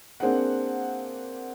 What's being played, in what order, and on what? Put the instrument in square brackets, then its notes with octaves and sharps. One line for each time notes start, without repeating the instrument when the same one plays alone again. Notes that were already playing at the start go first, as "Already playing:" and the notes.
[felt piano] A#3 C4 D4 G#4 F#5